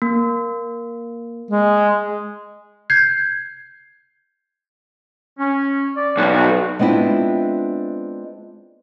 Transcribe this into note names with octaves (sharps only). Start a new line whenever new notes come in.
A#3
G#3
G6 G#6 C7
C#4
D5
B1 G3 F#4
G#3 B3 C4 D4 E4 F4